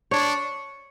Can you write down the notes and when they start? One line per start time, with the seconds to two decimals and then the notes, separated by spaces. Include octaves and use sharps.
0.11 D4 C#5